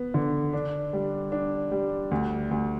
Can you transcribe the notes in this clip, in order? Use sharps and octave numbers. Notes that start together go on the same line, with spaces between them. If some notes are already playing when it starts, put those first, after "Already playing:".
Already playing: B3
D3
D4
G3
D4
G3
D2
D2